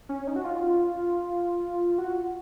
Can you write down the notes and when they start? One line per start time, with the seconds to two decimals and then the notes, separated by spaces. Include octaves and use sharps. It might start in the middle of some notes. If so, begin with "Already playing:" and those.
0.09 C#4
0.27 D#4
0.36 F#4
0.44 F4
1.98 F#4